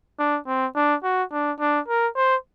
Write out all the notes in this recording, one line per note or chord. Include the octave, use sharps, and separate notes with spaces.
D4
C4
D4
F#4
D4
D4
A#4
C5